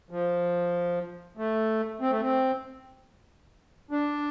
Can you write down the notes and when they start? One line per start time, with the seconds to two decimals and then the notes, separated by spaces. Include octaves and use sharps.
0.10 F3
1.37 A3
2.01 C4
2.11 A3
2.22 C4
3.91 D4